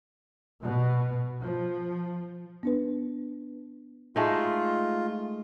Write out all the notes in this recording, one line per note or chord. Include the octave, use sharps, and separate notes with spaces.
B2
F3
B3 D4 B4
G#3 A3 D#4 F4